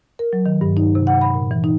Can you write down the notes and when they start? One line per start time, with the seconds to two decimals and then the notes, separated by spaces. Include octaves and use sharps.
0.19 A#4
0.33 F#3
0.46 D#3
0.61 G2
0.77 D#4
0.95 C3
1.07 F#5
1.21 B5
1.35 A#2
1.51 E3
1.64 D#4